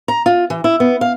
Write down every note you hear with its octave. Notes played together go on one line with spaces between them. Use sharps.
A#5
F4
E3
E4
B3
F5